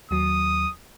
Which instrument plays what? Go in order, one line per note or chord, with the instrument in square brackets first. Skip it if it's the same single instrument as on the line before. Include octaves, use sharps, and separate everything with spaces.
[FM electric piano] D#2 F#3 [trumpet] D#6